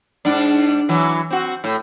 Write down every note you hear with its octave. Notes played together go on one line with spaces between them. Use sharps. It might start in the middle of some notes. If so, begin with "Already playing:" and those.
G#2 D4
E3 F#3
C4 F#4
A2